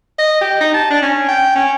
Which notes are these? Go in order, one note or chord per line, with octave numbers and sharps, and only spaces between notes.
D#5
G4
D#4
A5
D4
C#4
G5
C#4